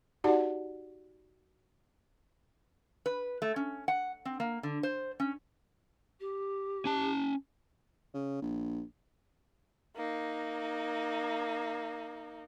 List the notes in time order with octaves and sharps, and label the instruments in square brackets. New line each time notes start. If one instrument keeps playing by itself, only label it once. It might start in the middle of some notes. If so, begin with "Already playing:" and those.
[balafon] D#4 F#4 G4 D5 F#5 A5
[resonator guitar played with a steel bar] B4
A3
C#4
F#5
C4
A#3
D3
C5
C#4
[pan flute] G4
[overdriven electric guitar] C#4 A5
[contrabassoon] C#3
A#1
[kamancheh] A#3 D#4